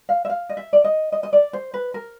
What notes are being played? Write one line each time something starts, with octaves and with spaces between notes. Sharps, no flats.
F5
E5
F5
D#5
E5
D5
D#5
D#5
D#5
D5
C5
B4
A#4